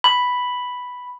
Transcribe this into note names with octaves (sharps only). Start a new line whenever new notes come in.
B5